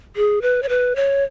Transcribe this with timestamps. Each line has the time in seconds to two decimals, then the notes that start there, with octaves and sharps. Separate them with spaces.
0.16 G#4
0.42 B4
0.63 C#5
0.69 B4
0.96 C#5